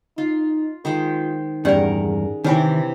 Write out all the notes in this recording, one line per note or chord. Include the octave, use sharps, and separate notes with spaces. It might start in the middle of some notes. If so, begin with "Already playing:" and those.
D#4 F4
D#3 G#3 F4 C5
E2 G2 C#4 G4 G#4 A#4 D5 F#5
C3 D#3 E3 D4 B4 C#5 G#5